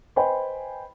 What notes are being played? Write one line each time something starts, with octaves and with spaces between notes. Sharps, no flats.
B4 C5 D#5 G5 G#5 B5